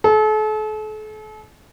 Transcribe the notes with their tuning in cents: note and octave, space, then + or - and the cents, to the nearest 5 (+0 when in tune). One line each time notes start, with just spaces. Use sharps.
A4 -40